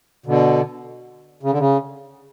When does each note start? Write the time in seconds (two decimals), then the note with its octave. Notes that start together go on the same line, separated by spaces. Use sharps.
0.26 B2 D3
1.43 C#3
1.51 D3
1.59 C#3